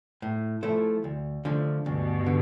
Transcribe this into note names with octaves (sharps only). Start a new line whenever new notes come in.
A2
F3 A3 E4
D2
D3 F3 A3
D2 G2 B2
D3